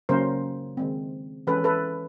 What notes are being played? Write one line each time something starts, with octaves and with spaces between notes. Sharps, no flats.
C#3 F#3 A#3 C#4 A#4 C5
D#3 G#3 C4
E3 G#3 C#4 A4 B4
A4 B4